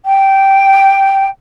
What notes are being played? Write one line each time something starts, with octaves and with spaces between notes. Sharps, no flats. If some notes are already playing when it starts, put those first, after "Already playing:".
G5